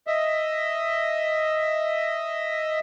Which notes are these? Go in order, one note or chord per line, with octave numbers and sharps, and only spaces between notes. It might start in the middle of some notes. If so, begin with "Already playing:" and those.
D#5 E5